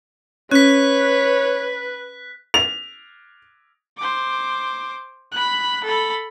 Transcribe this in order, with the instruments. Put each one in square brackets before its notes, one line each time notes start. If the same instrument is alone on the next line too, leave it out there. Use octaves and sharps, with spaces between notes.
[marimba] C#4 [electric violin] B4 [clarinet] C#5 [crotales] F#6 B6
[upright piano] F7
[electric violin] C5 D6
B5 F#6
A4 B5